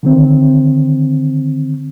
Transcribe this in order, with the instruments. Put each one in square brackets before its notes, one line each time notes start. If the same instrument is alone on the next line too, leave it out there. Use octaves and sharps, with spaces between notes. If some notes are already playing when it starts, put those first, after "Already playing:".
[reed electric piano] D3 D#3 C4